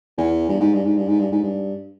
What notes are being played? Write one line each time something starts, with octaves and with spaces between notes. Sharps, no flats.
E2
G2
G#2
G2
G#2
G2
G#2
G2
G#2
G2